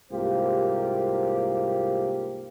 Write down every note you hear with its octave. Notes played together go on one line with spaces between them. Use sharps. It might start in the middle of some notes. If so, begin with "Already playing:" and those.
C2 G#2 A#3 F4 G4 C5